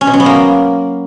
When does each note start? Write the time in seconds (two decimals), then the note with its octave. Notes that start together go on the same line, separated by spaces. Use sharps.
0.01 C#4
0.07 B2
0.14 F#3
0.20 B3
0.26 A#3